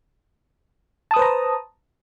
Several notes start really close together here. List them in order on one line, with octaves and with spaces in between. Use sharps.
A5 D#6 B4 C5 A#5